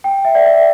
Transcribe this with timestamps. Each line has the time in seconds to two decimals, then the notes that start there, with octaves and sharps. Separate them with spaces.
0.04 G5
0.25 E5
0.35 D5
0.46 E5